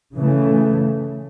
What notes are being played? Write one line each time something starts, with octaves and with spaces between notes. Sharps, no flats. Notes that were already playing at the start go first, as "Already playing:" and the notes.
C#3 E3 A3